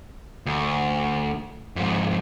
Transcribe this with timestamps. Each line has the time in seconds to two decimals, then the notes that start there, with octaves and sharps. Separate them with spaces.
0.46 D2
1.76 F2 G#2